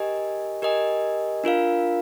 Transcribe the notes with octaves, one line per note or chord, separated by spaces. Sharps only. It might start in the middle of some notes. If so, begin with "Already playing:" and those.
Already playing: G4 A#4 D#5 G#5
G4 A#4 D#5 G#5
D4 F4 A#4 F5